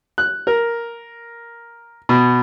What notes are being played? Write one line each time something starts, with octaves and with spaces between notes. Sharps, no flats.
F#6
A#4
B2